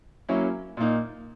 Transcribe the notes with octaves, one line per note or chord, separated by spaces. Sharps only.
F#3 A#3 C#4 E4
A#2 A#3 D#4